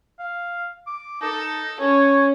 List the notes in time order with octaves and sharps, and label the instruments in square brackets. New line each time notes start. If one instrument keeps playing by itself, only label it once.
[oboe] F5
D6
[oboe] D#4 [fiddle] A4
[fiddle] C#4 [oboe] C#5